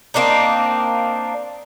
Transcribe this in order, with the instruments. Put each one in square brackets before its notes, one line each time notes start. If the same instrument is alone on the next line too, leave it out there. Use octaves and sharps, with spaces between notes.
[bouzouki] A#3 C4 D4 D#4